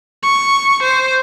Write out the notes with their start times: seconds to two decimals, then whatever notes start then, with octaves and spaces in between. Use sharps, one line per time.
0.23 C#6
0.83 C5